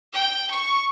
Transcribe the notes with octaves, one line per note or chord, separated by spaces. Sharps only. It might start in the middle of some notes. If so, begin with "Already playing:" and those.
G5
C#6